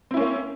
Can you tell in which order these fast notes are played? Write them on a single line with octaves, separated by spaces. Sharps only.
C4 E4 C#4 A#3